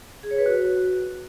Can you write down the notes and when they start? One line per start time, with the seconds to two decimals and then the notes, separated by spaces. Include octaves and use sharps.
0.23 G#4
0.31 C#5
0.38 B4
0.46 F#4